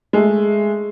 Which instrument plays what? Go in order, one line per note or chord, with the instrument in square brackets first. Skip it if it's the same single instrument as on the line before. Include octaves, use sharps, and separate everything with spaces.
[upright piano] G#3 A3